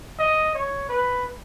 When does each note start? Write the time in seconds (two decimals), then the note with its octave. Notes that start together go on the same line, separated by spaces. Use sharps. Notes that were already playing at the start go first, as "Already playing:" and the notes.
0.19 D#5
0.54 C#5
0.89 B4